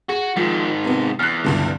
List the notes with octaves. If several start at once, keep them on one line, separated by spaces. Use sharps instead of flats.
F#4 G#4
G#2 D#3 F3
C3 B3
E2 F6 F#6
C#2 G2 D3